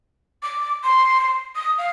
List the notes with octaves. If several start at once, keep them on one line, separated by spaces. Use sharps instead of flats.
D6
C6
D#6
F5